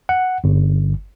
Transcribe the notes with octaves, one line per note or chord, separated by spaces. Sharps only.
F#5
G1